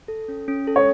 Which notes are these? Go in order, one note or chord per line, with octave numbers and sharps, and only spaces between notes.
A4
C#4
C#4
A4
C#5